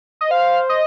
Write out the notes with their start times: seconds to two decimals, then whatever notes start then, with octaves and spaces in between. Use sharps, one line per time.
0.21 D#5
0.31 C5 F5
0.69 D#5